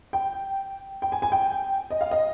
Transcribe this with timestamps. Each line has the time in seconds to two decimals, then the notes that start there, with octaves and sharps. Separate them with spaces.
0.13 G5
1.02 G5
1.12 G#5
1.22 G#5
1.32 G5
1.90 D#5
2.01 F5
2.11 D#5